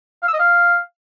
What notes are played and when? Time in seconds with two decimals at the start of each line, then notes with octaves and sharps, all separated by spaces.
0.22 F5
0.28 E6
0.34 D#5
0.39 F5